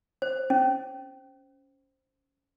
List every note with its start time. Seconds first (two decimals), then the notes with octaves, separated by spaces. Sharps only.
0.22 C5
0.50 C#4